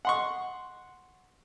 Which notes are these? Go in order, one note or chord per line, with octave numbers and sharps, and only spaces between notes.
F#5 C6 C#6